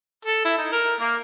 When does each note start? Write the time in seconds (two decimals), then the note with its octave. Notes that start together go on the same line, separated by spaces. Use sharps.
0.25 A4
0.45 E4
0.58 D#4
0.72 A#4
1.00 A#3